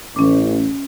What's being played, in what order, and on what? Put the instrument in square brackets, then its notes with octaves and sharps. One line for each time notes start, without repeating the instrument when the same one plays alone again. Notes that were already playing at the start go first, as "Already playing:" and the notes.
[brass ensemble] A1 [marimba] C#4 D6